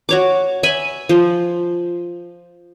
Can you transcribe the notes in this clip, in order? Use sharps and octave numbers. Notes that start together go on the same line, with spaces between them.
F#4 C#5 D6
E5 G#5 B5
F3 C5